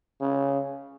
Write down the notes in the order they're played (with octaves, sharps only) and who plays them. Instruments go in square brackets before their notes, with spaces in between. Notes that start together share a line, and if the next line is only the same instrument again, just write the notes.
[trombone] C#3